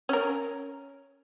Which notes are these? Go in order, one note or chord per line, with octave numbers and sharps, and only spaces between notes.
C#4 A#4